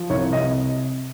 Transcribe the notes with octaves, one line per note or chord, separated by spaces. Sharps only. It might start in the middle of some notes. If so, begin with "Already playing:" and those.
Already playing: F3
C2 C#5
C3 D#5